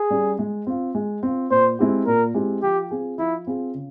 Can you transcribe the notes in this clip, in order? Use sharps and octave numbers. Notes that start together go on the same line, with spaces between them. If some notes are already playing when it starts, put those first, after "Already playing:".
Already playing: G#4
G3 C#4
G#3
C4 F4
G#3
C4 F4
A#2 C5
G#3 C4 E4 G4
A#2 A#4
G#3 C4 E4 G4
F3 G4
C4 F4 G#4
F3 E4
C4 F4 G#4
C#3